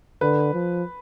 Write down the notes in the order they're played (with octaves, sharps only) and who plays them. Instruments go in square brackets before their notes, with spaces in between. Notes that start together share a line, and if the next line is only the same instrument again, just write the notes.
[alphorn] D3 [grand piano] B4
[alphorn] F3